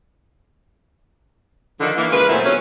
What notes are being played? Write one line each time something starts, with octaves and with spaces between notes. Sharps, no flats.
D3 D#3 F3
E3 A#3
C#3 G#3 A#3 F4 B4
A#2 F#3 A3 C4 C#4 E4
B2 D3 F#3 C#4